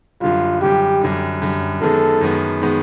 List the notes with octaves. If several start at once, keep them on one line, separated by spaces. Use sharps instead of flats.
F#2 D3 G3 F4
F#2 D3 G3 G4
F#2 D3 G3
F#2 D3 G3
F#2 D#3 G#3 B3 A4
F#2 D#3 G#3 B3
D#3 G#3 B3